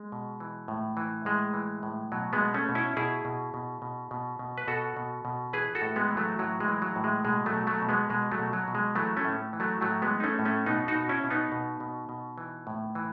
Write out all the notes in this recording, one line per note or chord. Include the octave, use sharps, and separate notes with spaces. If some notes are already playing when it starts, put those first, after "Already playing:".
Already playing: G#3
B2
E3
A2
E3
A2 G#3
E3
A2
B2 F#3
G#3 B3
B2
A3 C#4
B2
C#4 E4
B2 E4 G#4
B2
B2
B2
B2
B2
B4
B2 F#4 A4
B2
B2
E3 G#4 B4
F#4 A4
A2
G#3 B3
E3
F#3 A3
A2 F#3
G#3
E3
F#3
A2
G#3
B2 G#3
F#3 A3
B2
F#3 A3
B2
G#3 B3
B2 G#3
F#3 A3
B2
F#3
B2
G#3
E3 F#3 A3
A3 C#4
A2
E3
F#3 A3
A2 F#3 A3
G#3 B3
E3
D#4
A3 C#4
A2
A3 C#4
B2 B3 D#4
D#4 F#4
B2
C#4 E4
B2
B3 D#4
B2
B2
B2
E3
A2
E3